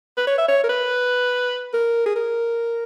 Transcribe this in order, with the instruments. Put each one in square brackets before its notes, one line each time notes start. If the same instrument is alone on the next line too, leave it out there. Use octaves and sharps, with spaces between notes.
[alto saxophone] B4
C#5
E5
C#5
A#4
B4
A#4
G#4
A#4